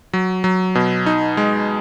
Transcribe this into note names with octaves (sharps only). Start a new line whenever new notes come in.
F#3
F#3
B2
D#4
G#3